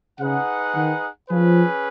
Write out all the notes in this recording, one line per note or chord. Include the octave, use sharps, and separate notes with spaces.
C#3 D#4 G#4 B4 F#5
D#3
F3 C#4 G#4 B4